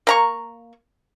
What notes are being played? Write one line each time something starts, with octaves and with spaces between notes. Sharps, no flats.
A#3 A#5 C#6